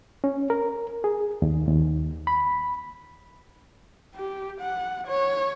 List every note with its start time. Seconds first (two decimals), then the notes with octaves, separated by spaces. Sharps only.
0.24 C#4
0.50 A#4
1.04 G#4
1.42 D#2
1.68 D#2
2.27 B5
4.16 G4
4.60 F#5
5.07 C#5